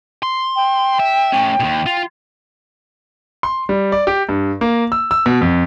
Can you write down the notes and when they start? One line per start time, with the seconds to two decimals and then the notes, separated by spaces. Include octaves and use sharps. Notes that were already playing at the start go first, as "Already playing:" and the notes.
0.23 C6
0.56 G5
1.00 E5
1.33 A3 C#4
1.60 D#2 B2
1.86 F4
3.43 C6
3.69 G3
3.92 D5
4.07 G4
4.29 G2
4.61 A#3
4.92 E6
5.11 E6
5.26 B2
5.41 F2